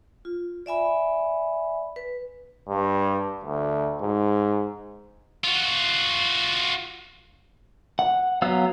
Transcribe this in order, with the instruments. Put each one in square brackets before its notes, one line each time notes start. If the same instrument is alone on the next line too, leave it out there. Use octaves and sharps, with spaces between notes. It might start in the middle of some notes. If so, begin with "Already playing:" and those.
[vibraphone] F4
D5 E5 G#5 B5
B4
[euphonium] G2
D2
G#2
[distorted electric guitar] F4 F#4
[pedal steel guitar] F#5
F#3 B3 F5 E6